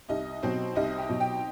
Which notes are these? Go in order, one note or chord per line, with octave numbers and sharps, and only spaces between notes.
C2 D#4 D#5
B2 F#3 C4 C5
C2 D#4 D#5
G4 G5
B2 F#3
G4 G5